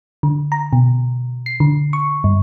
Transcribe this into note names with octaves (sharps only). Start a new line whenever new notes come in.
D3
A#5
B2
C7
D3
C#6
G2